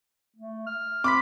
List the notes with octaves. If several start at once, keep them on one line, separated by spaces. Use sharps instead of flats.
A3
F6
C4 B5 C6 D6 B6